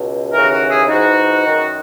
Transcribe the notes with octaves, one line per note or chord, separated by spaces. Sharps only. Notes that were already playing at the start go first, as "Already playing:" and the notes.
Already playing: C#2 B2
D#2 C#3 E3 F#4 A#4
F#4 A#4
E4 G#4
G#2 E3 D#4 F#4
F#2 D#3